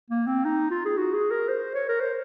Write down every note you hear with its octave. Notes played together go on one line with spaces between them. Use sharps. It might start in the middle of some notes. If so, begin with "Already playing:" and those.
A#3
C4
D#4
F4
G#4
F#4
G#4
A#4
C5
C#5
A#4
C5